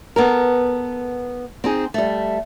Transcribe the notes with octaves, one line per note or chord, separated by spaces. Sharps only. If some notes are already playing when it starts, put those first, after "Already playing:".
B3 A4 A#4
C4 D#4 G#4
G3 A3